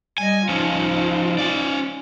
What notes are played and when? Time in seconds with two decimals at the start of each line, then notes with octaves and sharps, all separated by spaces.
0.18 G3 D#5 G#5
0.49 F3 C#4 D#4 F4
1.38 C#4 D5